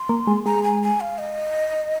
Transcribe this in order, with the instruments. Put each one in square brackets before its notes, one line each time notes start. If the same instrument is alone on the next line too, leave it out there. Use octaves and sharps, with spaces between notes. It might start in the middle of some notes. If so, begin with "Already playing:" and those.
Already playing: [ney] C6
[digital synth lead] A#3
G#3
[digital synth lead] G#3 [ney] A#5
[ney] G#5
G#5
F5
D#5